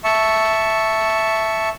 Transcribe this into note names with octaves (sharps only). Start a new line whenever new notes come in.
E5 A5 C#6